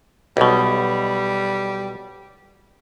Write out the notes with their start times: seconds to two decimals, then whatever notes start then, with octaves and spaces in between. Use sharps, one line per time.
0.37 B1 B2 G3